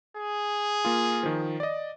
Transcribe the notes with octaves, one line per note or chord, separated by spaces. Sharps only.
G#4
A#3 F4
D#3 F3
D5 D#5